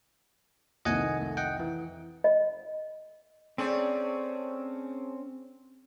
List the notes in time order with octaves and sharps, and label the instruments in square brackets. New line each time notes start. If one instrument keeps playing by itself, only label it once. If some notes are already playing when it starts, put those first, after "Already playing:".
[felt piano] C2 F2 D#3 [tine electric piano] D#5 F#5 G#5
[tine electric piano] A3
D#5 F#5 G5
E3
[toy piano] D#5
[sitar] A3 G#4 D5 [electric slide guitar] C4 C#4